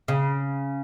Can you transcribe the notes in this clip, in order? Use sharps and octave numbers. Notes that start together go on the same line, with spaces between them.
C#3